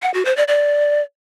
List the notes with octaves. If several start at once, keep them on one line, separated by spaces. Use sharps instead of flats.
F#5
F#4
C5
D5
D5